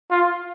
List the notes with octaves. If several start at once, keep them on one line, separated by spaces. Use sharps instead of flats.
F4